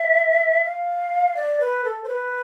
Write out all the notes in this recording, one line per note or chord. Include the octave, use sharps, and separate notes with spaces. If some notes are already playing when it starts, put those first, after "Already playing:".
Already playing: E5
F5
D5
B4
A4
C5
B4